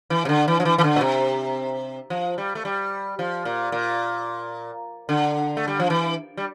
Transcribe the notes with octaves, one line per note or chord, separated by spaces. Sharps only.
E3
C3
D3
E3
F3
E3
E3
D3
A#2
C3
F3
G3
A3
G3
F3
A#2
A#2
D3
A3
G3
F3
E3
G3